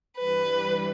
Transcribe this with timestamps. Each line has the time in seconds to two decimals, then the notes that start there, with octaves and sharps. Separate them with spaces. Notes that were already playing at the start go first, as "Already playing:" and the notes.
0.17 G2 E3 G3 B4